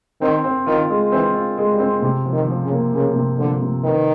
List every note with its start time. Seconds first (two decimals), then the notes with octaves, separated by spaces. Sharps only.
0.21 D#3 C4
0.44 C4
0.66 D#3 F4
0.90 G#3
1.12 E3 C4
1.34 F4
1.58 G#3
1.73 G3
1.79 C4
2.02 C3
2.26 F3
2.33 D#3
2.48 F3
2.63 C#3
2.70 A#3
2.93 C#3 A#3
3.16 C3
3.38 D3 F3
3.62 C3
3.84 D#3 B4